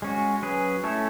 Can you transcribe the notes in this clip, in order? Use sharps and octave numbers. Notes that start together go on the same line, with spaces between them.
G#3 C#4 F#4
F#3 C#4 G#4 B4
A3 C#4 E4 A4 C#5